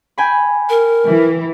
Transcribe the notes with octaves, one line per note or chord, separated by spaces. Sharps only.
G5 G#5 B5
A#4
E3